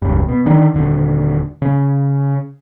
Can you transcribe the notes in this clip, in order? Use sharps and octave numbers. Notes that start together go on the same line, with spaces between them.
E1 C#2 G2
B2
D3 D#3 D4
D#1 D3
C#3